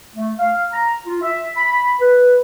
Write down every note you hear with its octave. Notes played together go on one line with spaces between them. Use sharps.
A3
F5
A#5
F4
E5
B5
B4